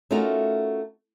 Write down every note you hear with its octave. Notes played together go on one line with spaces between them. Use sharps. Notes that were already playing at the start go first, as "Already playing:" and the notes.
A3 C#4 D#4 F4 F#4 A#4